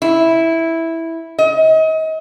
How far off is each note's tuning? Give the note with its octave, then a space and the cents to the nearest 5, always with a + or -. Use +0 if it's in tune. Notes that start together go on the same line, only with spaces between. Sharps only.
E4 -5
D#5 +35